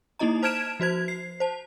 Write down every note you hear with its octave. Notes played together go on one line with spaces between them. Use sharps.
A#3 D#4 E4 D#5 A#5
C5 A5 F6 G#6 D7 E7
F3 F#4 C5 G#6
C7
C5 A5